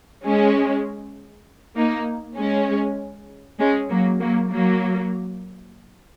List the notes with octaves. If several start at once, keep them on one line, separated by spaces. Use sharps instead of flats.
G#3 C#4
A#3 D#4
G#3 C#4
G#3 C#4
F#3 A#3
F#3 A#3
F#3 A#3